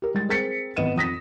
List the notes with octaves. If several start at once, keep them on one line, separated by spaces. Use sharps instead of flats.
G4 A#4
G3 G#3 A6
C4 G#4 A#4 A6 B6 C#7
G#1 B3 B4 D#5 D#7 E7
F2 D#6 A#6 B6